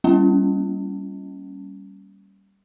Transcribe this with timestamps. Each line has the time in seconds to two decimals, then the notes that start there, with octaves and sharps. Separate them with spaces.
0.04 G3 A#3 C#4